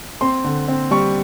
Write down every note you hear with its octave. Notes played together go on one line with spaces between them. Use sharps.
C4 C6
D3
C4
G3 C#6